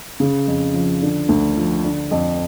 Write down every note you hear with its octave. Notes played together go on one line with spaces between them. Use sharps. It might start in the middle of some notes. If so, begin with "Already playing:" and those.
C#3
F2
F3
D3
D2
F3
D3
F2